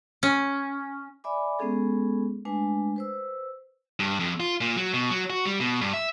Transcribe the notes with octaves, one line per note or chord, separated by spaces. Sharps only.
C#4
D5 E5 G#5 B5 D6
G#3 B3 C#4 G#4 A4
G#3 A3 D4 B4 G#5
B4 C5 E6
G2
F2
F4
A#2
F#3
B2
F#3
F#4
G3
B2
G2
E5